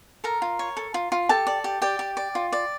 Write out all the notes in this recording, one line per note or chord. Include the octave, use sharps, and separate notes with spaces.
A4 A#4 A#5
F4
C#5
A4
F4
F4
G4 A4 A5
D5
G4
G4 D5 G5
G4
D5
F4
D5